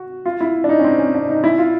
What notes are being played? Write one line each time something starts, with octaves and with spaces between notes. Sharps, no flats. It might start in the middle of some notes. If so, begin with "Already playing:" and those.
Already playing: F#4
F4
E4
D4
D#4
C#4
C4
C#4
D4
D#4
E4
F4